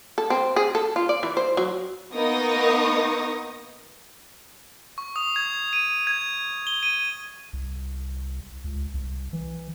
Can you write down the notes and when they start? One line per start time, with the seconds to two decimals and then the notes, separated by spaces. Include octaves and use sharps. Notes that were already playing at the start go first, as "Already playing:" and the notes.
0.18 A4
0.30 C4
0.56 G#4
0.75 A4
0.96 F4
1.09 D5
1.23 E3
1.37 C5
1.57 F#3
2.13 A#3 B3 D#4 C#6 D#6 A#6
4.98 C#6
5.16 D#6
5.36 G#6
5.73 D#7
6.07 G#6
6.67 G7
6.83 D#7
7.53 C2
8.64 C#2
8.94 C2
9.33 E3